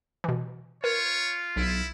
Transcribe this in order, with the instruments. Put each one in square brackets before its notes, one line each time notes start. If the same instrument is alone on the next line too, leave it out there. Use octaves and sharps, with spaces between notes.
[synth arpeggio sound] B2 E3
[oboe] F4 [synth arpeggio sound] A#4 [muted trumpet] C#5
[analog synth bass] B1 [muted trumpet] E4